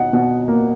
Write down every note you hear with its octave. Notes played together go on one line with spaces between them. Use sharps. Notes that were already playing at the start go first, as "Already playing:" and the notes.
Already playing: B2 D#4 F#5
B2 F#5
A#3